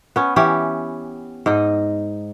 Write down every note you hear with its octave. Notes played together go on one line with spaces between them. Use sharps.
B3 C#4
E3 C#4 G4
G#2 D#4 D#5